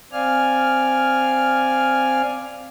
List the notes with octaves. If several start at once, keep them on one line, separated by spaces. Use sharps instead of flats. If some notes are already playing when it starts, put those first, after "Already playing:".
C4 D5 F5 G#5 F6